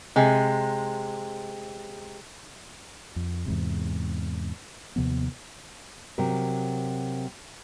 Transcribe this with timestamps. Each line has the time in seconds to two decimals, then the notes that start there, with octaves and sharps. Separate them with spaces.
0.16 C3 G#3
3.16 F2
3.46 E2 G#2 C3
4.96 D#2 C3 F3 B3
6.18 C3 F#3 A#4